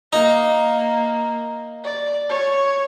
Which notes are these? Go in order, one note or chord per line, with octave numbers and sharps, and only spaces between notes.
A#3 D#4
D5
C#5